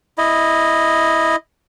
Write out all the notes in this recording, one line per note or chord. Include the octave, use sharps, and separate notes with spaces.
E4 D#5